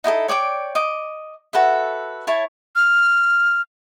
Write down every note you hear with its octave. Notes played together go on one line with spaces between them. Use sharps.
D#4 E4 G4 A4
C#5 D5 G5 D6
D#5 D6
F#4 A4 B4 E5
E4 C#5 A5
F6